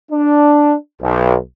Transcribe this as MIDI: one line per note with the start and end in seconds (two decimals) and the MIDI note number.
0.12 0.73 62
1.02 1.36 35